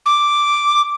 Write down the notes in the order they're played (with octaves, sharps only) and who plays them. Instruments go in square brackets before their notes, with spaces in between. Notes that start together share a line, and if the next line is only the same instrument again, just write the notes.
[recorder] D6